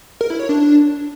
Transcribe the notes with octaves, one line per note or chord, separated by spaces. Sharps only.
A#4
E4
C#5
D4